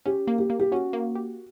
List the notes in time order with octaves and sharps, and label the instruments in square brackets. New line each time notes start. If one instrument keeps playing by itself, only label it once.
[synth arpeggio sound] C#4 [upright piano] G4
[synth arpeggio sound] A#3
[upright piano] G4
[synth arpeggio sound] A#3
[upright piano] G4
[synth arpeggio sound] C#4 [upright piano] F#4
[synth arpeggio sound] A#3
G4